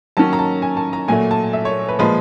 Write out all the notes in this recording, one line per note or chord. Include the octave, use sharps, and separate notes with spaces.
D#3 F#3 A#3 C#4 A5
A#5
A5
G#5
A5
A#5
A#2 F#3 A3 G#5
A5
E5
C#5
B4
A#2 F3 G#3 B4